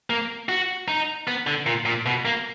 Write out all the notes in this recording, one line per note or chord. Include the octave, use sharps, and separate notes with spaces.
A#3
F#4
D#4
B3
D3
A#2
A#2
B2
A#3